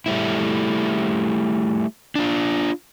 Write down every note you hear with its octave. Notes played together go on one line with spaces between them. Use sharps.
G3 A3 E4
D4 F4